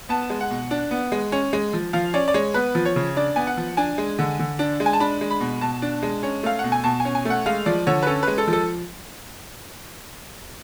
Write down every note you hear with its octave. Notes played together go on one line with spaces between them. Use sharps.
B3 A5
G#3
F#5
B2
D4
B3
G#3
C#4
G#3
F3
F3 F5
C#4 D5
D5
G#3 C#5
B3 B4
F3
C#5
C#3
D4 D5
B3 G#5
F#5
F3
D4 G#5
G#3
D3
D3
D4
G#3
G#5
A5
D4 B5
G#3
B5
B2
B2 A5
D4
G#3
C#4
A3 F5
B2 F#5
G#5
B2 A5
G#5
C#4
G#5
A3 F#5
G#3 F5
F3 D5
D3 C#5
B4
C#4 A4
G#3 B4
A4
F3
A4